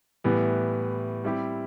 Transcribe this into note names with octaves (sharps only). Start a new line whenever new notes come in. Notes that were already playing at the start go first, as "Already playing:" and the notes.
A2 E3 G3 B3
G3 C4 E4 G4